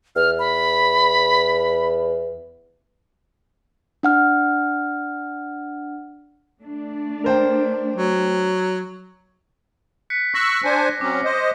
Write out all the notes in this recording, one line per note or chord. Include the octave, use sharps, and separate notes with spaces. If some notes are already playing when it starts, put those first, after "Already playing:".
E2 F6
B5
D4 F#5 F6
A3 D4
A#4 C5 G5
F#3
F#6 B6 C#7
C#6 E6 F#6 A#6
D4 C5 G#5
F#3 C4 C#4 D6
C5 D#5